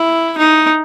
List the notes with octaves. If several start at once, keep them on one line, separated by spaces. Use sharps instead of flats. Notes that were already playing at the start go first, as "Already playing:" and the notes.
Already playing: E4
D#4